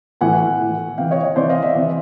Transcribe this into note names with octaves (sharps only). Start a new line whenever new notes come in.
A2 E3 F#5 G#5
A2 E3
C3 E3 F5 G5
C#5 D#5
C#5 D#5
C3 E3 C5 D5
D#5 F5
D5 E5
C3 E3